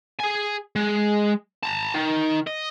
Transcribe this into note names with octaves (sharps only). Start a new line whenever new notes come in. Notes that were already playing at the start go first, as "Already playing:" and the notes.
G#4 G#5
G#3
A5 A#5
D#3
D#5